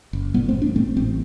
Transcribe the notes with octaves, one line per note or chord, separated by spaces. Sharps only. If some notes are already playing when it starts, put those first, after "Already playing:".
F#1
A2 G3 B3
A3 C4
A1
B3 D4
A2 A3 C4
A1 A3 C4